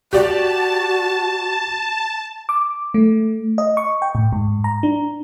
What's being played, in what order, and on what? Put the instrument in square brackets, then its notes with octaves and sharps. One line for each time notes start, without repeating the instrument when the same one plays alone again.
[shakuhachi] F#4 [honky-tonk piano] G4 D5 [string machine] A5
[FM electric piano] D6
A3
D#5
C#6
G5
A2
G#2
A#5
D4